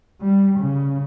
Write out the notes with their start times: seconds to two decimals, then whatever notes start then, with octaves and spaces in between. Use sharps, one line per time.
0.21 G3
0.59 C#3